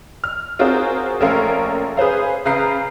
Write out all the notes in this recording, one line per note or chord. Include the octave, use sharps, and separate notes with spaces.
F6
C4 F4 F#4 G#4 A#4 C5
A#1 A3 C#4 A#4 F5 C6
G#4 B4 C5 F5
C#3 B4 F5 A#5 G6 C7